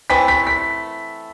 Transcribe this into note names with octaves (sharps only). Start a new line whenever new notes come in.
E3 A3 C4 B6
B6
B6